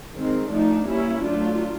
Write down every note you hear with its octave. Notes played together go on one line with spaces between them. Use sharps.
D#3 G#3 C4
F3 A3 D4 D#4
G3 A#3 C#4 E4
F#3 A3 D4 F4